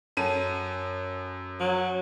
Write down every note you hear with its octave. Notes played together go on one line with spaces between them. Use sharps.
F#2 A4 D#7
F#3